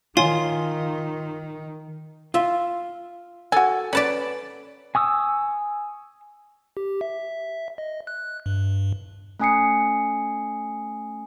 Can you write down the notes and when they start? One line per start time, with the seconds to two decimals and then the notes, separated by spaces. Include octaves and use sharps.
0.17 D#3 F4 C#5 G#5 C6
2.34 F4 E5
3.52 F#4 A4 G#5
3.93 C#4 B4 D5 A5 B5
4.95 G#5 C#6 D#6 E6
6.77 G4
7.01 E5
7.78 D#5
8.07 F#6
8.46 G2
9.39 A3 C#4 G#5 D#6 C7 C#7